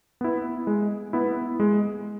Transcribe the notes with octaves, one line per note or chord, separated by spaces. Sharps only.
B3 E4
G#3
B3 E4
G#3